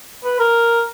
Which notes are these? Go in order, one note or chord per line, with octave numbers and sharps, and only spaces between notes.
B4
A#4